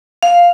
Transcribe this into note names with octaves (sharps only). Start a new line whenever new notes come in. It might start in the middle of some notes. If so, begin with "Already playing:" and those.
F5